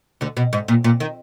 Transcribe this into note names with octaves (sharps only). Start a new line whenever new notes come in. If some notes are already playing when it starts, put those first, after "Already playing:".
D2 D3
B2
G#2
A#2
A#2
D#3